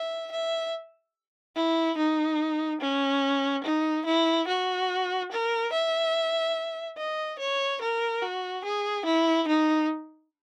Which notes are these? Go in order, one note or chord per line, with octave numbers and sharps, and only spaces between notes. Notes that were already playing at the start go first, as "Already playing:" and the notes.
Already playing: E5
E5
E4
D#4
C#4
D#4
E4
F#4
A#4
E5
D#5
C#5
A#4
F#4
G#4
E4
D#4